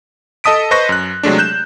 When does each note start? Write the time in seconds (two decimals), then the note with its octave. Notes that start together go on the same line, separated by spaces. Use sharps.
0.44 A4 D#5 A5 D#6 B6 D7
0.71 B4 C5 D#5 C#6 A#6
0.89 F#2 F#6
1.23 C3 F#3 G#3 A3 D4
1.38 F#6 G6 E7